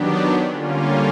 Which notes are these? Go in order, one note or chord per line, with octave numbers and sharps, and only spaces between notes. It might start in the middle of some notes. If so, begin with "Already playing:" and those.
Already playing: D#3 F#3 B3 D4 G4
D3 G3 A#3 C#4 F4